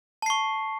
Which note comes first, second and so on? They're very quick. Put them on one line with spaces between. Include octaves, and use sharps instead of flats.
A5 C7 C#6